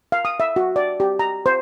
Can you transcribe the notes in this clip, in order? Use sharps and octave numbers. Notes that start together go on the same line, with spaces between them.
F5
D#6
E5
F#4
D5
G4
A#5
C5